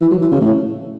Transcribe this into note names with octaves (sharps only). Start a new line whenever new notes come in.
E3
F#3
E3
C#3
A2